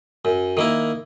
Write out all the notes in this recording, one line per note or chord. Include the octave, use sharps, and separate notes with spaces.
F#2
D#3 A#3 E4